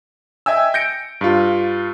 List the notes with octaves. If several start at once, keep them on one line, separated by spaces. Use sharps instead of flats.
D#5 E5 G5 G#5 E6
G6 A#6 C#7 D7
G2 F4